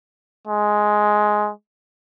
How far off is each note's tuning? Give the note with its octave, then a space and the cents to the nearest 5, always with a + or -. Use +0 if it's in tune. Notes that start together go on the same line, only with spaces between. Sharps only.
G#3 +10